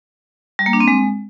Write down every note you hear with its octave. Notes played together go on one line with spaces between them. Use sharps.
G3
A#3
D4
C4
G#3